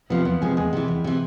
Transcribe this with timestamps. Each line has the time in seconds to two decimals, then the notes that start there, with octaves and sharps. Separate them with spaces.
0.10 C3 F3 B3
0.25 E2 B3
0.41 C3 F3 G#3
0.57 E2 G#3
0.73 C3 E3
0.88 E2
1.04 C3 E3